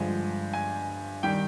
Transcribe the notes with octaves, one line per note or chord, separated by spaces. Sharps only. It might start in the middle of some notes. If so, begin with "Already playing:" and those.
Already playing: G2 D3 F3 G#3 G#5
G#5
D#3 G3 G5